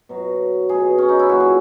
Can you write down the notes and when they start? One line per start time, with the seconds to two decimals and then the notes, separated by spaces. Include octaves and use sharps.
0.09 B2 F#3
0.69 B2 F#3 G#4
0.98 C#4
1.09 D#4
1.19 E4
1.29 A#2 F#3 F#4
1.40 G#4